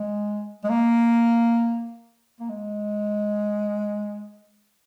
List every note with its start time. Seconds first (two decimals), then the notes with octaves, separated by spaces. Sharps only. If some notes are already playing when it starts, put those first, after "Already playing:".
Already playing: G#3
0.64 G#3
0.70 A#3
2.40 A#3
2.49 G#3